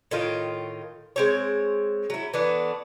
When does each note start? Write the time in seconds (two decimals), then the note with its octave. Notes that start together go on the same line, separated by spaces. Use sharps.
0.11 A2 D#3 F4
1.16 G#3 C4 C#5
2.10 F#3 E4
2.34 E3 A3 B3 D4